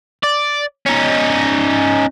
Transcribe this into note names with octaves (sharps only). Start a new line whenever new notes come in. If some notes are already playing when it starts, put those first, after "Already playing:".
D5
C#4 D#4